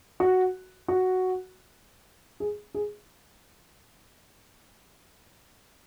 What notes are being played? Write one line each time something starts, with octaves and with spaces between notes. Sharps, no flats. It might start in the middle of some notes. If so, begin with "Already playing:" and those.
F#4
F#4
G#4
G#4